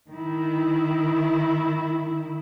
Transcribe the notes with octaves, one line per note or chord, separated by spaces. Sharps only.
D#3 E4